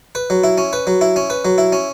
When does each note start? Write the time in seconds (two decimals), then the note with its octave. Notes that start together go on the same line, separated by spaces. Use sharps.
0.15 B4
0.30 F#3
0.44 E4
0.58 C#4
0.73 B4
0.87 F#3
1.01 E4
1.16 C#4
1.30 B4
1.45 F#3
1.58 E4
1.72 C#4